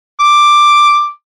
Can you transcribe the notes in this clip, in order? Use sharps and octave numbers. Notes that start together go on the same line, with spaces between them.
D6